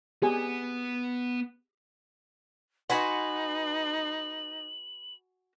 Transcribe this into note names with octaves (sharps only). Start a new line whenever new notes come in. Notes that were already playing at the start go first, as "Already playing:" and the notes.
B3 G4 G#4 G#5
D#4 F#4 B4 F#5 G#5 C6 F#7